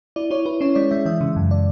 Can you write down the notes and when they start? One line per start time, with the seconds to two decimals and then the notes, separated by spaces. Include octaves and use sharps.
0.16 E4 D5
0.31 E4 C#5
0.46 E4 B4
0.61 C#4 C#5
0.75 G#3 D5
0.91 G#3 E5
1.06 E3 E5
1.21 C#3
1.36 F#2
1.51 D5